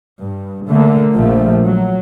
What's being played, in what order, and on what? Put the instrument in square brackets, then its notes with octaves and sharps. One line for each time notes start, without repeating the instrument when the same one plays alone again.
[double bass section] G2
D3 A3 A#3
A#1 A#2 F3 A3
F#3